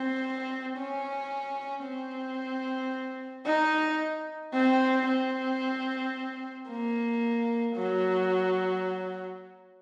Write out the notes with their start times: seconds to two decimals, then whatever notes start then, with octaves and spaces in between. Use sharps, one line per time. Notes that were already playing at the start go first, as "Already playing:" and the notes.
Already playing: C4
0.77 C#4
1.85 C4
3.46 D#4
4.54 C4
5.08 C4
6.69 A#3
7.76 F#3